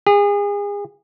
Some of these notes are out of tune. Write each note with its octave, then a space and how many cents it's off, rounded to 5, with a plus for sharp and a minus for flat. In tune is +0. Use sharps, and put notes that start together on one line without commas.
G#4 -35